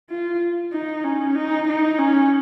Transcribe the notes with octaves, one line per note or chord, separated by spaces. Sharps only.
F4
D#4
C#4
D#4
D#4
C#4